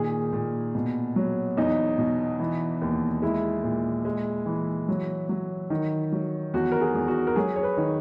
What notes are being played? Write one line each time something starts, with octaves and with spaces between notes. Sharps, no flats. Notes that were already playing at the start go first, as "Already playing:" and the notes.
Already playing: A#2 D#3 G#4
A#2
B2
F#3
E2 D#4
B2
E3
D#2
G#3 E4
A#2
G#3
E3
F#3
F#3
D#3
F#3
E2 F#4
A#4
G#4
E2
F#4
A#4
F#3 G#4
C#5
B4
D#3